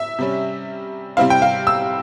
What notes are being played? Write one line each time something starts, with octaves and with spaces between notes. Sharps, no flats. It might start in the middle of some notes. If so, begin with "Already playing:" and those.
Already playing: E5
C3 G3 C#4
C3 G3 C4 E4 F5
G5
F5
E6